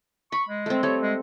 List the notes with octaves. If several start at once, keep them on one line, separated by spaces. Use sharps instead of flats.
B5 C#6
G#3
A3 C4
G3 A3 C#5
G#3